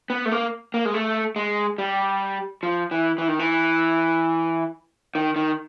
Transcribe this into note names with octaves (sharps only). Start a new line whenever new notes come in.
B3
A3
A#3
A#3
G#3
A3
G#3
G3
F3
E3
E3
D#3
E3
D#3
D#3